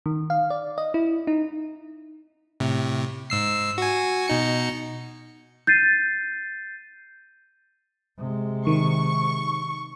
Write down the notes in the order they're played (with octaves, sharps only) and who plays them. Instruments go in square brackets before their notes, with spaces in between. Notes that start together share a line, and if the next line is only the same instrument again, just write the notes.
[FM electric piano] D#3
F5
D5
D#5
E4
D#4
[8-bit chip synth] A2 C3
G#2 E6 C7
F#4 G#5
B2 D#4 C#7
[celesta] G6 A6 C7 D#7
[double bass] C3 G#3
[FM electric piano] D#3 [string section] C#6